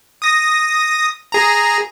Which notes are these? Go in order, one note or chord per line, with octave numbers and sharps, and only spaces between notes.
D#6 A#6
G#4 A#5